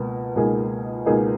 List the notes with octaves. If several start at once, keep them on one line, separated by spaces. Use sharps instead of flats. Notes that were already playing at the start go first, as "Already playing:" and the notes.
Already playing: C#2 B2 A#3
C#2 B2 A#3 D#4 G#4
C#2 B2 A#3 D#4 G#4